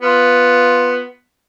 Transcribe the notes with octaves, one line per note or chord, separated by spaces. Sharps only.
B3 F4